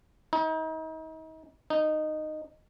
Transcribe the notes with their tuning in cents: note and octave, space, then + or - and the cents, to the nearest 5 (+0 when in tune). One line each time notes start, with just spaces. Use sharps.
D#4 +35
D#4 -15